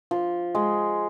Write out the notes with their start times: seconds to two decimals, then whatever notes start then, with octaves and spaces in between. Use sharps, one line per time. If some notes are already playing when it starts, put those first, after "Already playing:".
0.11 F3
0.55 G#3